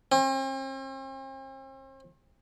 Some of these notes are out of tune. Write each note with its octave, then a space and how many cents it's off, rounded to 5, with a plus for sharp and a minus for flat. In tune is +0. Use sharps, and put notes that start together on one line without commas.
C4 +45